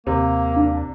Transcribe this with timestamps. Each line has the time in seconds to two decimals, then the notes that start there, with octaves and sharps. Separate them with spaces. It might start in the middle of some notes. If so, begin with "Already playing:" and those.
0.07 D#2 C3 A#3
0.56 D4